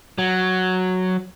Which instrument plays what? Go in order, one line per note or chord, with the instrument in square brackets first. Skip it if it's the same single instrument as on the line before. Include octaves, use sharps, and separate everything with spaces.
[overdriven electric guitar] F#3